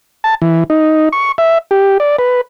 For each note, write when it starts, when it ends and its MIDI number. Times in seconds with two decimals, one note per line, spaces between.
0.24 0.35 81
0.42 0.64 52
0.70 1.09 63
1.13 1.32 85
1.38 1.58 76
1.71 1.98 67
2.00 2.16 74
2.19 2.41 71